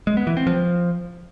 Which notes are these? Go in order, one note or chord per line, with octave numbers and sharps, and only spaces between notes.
G#3
B3
E3
C4
F3